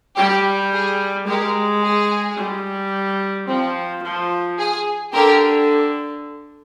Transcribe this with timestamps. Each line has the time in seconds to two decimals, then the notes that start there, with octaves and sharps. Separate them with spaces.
0.17 G3 G4
0.73 G#4
1.27 G#3 G4 A#4
1.82 G#4
2.38 G3
3.48 F3 C4
4.03 F3
4.58 G#4
5.13 D3 G4 A#4